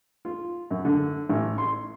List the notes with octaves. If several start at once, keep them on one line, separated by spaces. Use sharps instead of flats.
F4
F#2
D3
A1
C6